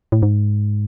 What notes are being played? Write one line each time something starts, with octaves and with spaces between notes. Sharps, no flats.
A2
G#2